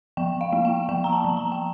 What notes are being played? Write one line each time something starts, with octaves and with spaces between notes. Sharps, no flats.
F3 G5
F5
A#3
G5
F3 G5
A#5
A5
F3
A#5
G5